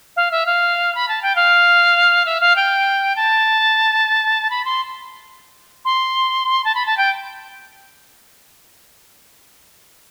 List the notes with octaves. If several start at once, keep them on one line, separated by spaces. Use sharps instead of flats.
F5
E5
F5
B5
A5
G5
F5
E5
F5
G5
A5
B5
C6
C6
A5
B5
A5
G5